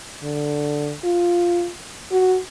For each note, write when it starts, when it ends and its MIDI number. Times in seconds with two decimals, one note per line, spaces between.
0.23 0.93 50
1.04 1.69 65
2.12 2.38 66